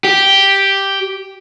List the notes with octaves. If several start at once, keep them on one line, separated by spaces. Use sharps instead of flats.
G4